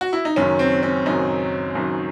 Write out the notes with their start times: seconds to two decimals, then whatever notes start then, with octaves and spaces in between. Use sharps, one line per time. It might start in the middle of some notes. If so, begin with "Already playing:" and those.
0.01 F#4
0.13 E4
0.25 D#4
0.36 F#1 F#2 D#3 F#3 C#4
0.59 C4
0.83 C#4
1.06 F#1 F#2 D#3 F#3 D#4
1.75 F#1 F#2 D#3 F#3